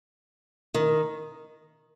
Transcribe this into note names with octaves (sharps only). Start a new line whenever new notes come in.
D#3